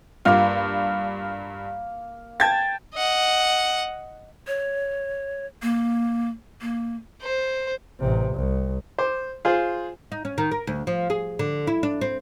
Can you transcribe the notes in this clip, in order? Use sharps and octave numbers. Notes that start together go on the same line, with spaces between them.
G2 A#3 F4 F5
G5 A5 G#6 A6
D#5 F#5
C#5
A#3
A#3
C5
A1 C3
C2
C5 D6
F4 G#4 C5
D#4
C#4
D#3
A#4
D2
F3
G#4
D3
E4
D4
C4